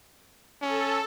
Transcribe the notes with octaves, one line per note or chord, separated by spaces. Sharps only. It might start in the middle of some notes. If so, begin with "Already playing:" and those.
C#4 A4